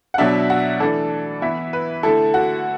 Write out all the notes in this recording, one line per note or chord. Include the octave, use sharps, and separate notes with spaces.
F#5
B2 F#3 D4 E5
F#4
E3 A3 D4 A4
E3 B3 E4 E5
B4
D3 A3 E4 A4
F#4